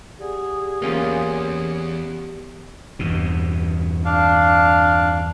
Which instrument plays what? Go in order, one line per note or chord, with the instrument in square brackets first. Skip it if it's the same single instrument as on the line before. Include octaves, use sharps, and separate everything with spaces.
[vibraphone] G4 D5 F#5 [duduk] G#4
[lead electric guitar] E2 [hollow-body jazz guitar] A#3 C#4 F4
[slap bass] E2 G2 B2
[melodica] D4 F5